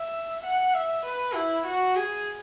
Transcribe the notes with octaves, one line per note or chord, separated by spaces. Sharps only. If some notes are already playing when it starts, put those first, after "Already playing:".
Already playing: E5
F#5
E5
B4
E4
F#4
G#4